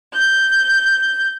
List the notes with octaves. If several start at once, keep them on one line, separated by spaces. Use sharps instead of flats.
G6